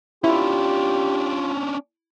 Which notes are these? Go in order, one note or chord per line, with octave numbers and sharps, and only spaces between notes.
C#4 D4 E4 F4 G4